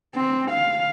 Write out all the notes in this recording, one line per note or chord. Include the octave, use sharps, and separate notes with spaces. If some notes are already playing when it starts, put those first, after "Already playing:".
C4
F5